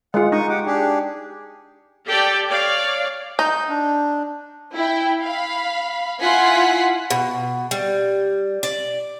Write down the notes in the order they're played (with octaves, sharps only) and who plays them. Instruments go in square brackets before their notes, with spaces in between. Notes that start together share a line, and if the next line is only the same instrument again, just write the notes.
[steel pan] G#3 F4 [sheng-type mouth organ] F#5
[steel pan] D#4 [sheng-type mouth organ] C#6 D#6
[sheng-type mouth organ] G4 F#5 D6
D4 G4 G#4
[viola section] G4 A4 D5 G5
C#5 D5 F5
[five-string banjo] D#4 [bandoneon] G6
[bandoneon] D4
[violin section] E4 G5
F5 B5
E4 F4 F#5 G#5 B6
[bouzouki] B2
G3
D5